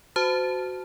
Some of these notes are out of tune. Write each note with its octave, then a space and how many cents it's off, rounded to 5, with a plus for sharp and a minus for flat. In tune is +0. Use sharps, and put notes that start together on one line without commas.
F#4 +0 C5 -35 A5 +0